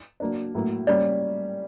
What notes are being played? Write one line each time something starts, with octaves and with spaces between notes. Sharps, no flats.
F#3 A#3 D4
A2 F#3 A#3
G3 A#3 C#4 D5